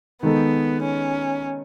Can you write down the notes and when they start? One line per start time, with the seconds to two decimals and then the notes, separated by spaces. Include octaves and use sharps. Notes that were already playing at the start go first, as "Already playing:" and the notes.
0.23 D#3 G#3 B3 D#4 A4
0.82 C#4